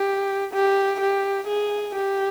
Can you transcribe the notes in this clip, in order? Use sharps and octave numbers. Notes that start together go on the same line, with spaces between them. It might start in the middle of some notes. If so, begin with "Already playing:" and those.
Already playing: G4
G4
G4
G#4
G4